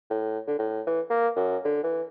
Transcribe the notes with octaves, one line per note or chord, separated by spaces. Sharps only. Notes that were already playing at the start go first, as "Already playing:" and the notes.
A2
D3
A2
E3
A#3
F#2
D3
E3